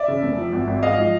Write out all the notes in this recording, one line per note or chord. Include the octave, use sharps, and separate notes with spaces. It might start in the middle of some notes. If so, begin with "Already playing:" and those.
Already playing: D5 E5
C#3
F1
F3
G#1
G#1
G#2 D#5 F5
F3